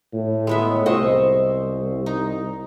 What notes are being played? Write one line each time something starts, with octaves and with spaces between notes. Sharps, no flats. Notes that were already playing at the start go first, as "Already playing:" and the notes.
A2
G#3 B3 E5
C2 C5 D#5 C#6 E6
D#4